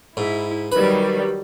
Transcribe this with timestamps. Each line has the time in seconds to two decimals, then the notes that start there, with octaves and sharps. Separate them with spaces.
0.17 G#2 E4
0.72 D#3 F#3 G3 B4